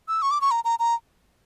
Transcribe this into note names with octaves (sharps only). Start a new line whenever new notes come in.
E6
C#6
D6
C#6
A#5
A#5
A#5